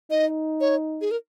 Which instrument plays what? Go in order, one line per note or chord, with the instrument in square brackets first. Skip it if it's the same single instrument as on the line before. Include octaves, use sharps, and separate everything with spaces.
[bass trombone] D#4 [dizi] D#5
[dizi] C#5
G#4
A#4